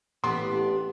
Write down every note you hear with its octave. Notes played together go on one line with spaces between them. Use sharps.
A1 B3 D4 G4 C6